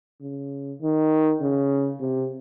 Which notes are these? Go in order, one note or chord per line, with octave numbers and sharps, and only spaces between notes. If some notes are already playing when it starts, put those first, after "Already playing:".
C#3
D#3
C#3
C3